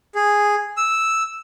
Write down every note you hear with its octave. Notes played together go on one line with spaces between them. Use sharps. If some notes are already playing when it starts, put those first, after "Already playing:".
G#4
E6